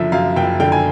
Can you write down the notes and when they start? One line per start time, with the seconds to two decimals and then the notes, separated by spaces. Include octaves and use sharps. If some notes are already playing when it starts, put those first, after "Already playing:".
Already playing: F#1 F#2 D3 F3 E5
0.12 F#2 F5
0.36 F#1 G5
0.60 D3 G5
0.72 G#5